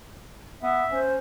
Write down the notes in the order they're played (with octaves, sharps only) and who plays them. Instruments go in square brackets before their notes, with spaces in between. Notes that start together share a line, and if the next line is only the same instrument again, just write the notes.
[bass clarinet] B3 [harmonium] E5
[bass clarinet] C#4 [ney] C5